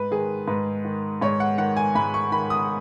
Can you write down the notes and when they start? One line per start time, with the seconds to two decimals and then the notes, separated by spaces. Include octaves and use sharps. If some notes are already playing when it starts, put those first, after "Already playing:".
Already playing: G#2 B4
0.11 D#3 G#4
0.47 G#2 B4
0.85 D#3
1.21 G#2 C#5
1.40 F#5
1.58 D#3 F#5
1.77 G#5
1.95 G#2 B5
2.14 C#6
2.32 D#3 B5
2.50 D#6